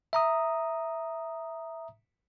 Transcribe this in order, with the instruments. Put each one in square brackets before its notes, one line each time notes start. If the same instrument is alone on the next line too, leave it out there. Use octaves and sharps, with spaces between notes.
[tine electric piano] E5 A#5 D#6